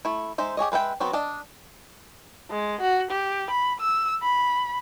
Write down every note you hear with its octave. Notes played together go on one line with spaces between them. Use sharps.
A3 E4
G#3 D#4 C5 E5
G4 G#4 C#5 D#5
G#3 B4 E5 G5
F#3 B3 C4 F#4
D4 D#5 A5
G#3
F#4
G4
B5
E6
B5